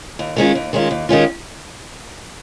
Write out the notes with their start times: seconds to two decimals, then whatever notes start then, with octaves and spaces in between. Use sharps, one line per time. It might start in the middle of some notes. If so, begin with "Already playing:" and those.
0.19 D#2
0.36 D#3 G#3 C#4 F4
0.55 D#2
0.73 D#3 G#3 C#4 F4
0.91 D#2
1.09 D#3 G#3 C#4 F4